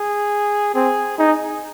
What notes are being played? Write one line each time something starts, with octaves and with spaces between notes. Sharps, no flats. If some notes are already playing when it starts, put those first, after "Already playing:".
Already playing: G#4
C4 G#4
D#4 G#4